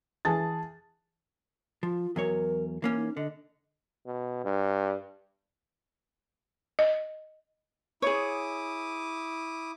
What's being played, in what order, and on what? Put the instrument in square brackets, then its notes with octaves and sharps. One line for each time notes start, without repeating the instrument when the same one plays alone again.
[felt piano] E3 G#4 A5 A6
[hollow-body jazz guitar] F3 [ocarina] F4
[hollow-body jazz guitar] E2 F#3 C#5 [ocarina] A#4
[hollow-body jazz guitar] E3 A#3 C#4
[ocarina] D#4
[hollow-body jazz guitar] D3 [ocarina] D#5
[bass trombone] B2
G2
[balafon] D#5
[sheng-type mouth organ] E4 D6 D#6 [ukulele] G#4 C#5